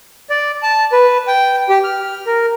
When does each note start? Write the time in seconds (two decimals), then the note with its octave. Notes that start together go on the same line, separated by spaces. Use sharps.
0.30 D5
0.63 A5
0.92 B4
1.27 G5
1.69 G4
1.84 F6
2.27 A#4